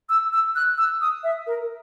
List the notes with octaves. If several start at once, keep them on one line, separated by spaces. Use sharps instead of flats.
E6
E6
F#6
E6
D#6
E5
A#4